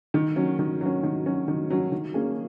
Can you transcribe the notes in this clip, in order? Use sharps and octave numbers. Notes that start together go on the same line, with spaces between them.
D#3
F#3 C#4
D#3
F#3 C#4
D#3
F#3 C#4
D#3
F#3 C#4
D#3
A#3 C#4 G#4